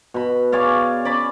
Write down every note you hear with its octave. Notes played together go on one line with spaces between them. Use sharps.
B2 B5
G#4 C#5 D5 F5
C#4 D5 B5